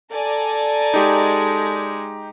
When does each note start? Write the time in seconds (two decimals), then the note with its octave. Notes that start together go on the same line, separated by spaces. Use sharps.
0.12 A4 D5 G#5 A#5
0.94 G#3 D#4 G4